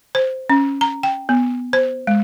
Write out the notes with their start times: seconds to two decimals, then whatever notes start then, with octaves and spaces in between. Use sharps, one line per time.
0.15 C5
0.50 C#4
0.81 A#5
1.03 G5
1.29 B3
1.73 C5
2.07 G#3